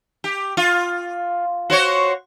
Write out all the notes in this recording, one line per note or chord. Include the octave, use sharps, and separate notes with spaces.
G4
F4
F#4 C5 C#5